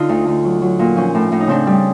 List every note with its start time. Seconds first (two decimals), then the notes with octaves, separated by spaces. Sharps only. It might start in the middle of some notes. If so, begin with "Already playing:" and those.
Already playing: D3 D#4 F4
0.09 D2
0.27 D2
0.45 F#3
0.62 F#3
0.79 A#2
0.96 F3 C#4
1.15 A2
1.32 A2
1.40 D#4
1.47 C#3 C4 D4
1.67 G3